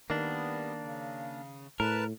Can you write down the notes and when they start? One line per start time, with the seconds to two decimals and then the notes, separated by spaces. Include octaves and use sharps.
0.10 D#3 G3 A#3 B3 D4
0.81 C#3
1.80 A2 A#4 B4 A5